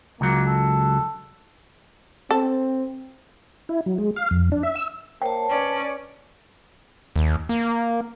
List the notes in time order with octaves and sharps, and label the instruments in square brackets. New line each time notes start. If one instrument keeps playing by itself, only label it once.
[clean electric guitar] C#2 F#3 [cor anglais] A#3
[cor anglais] A4
[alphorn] C4 [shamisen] A4
[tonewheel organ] E4
F#3
G#3
F5
F2
D4
E5
E6
[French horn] A#3 [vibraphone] C5 C#5 A5 [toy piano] G5
[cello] C#4 D5 [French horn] B4
[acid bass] D#2
A#3